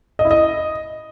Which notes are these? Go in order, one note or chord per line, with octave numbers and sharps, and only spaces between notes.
D#5
E4
D#5